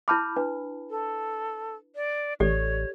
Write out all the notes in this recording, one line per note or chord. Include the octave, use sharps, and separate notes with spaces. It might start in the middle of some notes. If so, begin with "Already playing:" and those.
E4 A5 B5 D6 F6 G6
D4 B4
A4
D5
A1 G4 A4 C#5 D5